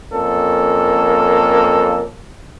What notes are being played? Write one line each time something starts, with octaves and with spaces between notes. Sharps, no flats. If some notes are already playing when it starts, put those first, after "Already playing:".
F2 A#3 C#4 A4